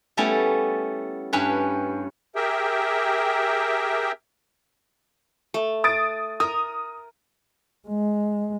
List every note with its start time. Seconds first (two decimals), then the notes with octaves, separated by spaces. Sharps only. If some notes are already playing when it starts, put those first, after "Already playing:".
0.17 G3 A3 B3 C#4 E4
1.33 G2 C#4 B4
2.36 G4 G#4 A#4 E5 G5
5.54 A3
5.84 D#6 A6 D7
6.40 A#4 D#6
7.88 G#3